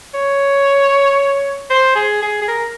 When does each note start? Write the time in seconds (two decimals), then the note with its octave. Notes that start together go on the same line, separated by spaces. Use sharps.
0.14 C#5
1.70 C5
1.95 G#4
2.22 G#4
2.42 G#4
2.48 A#4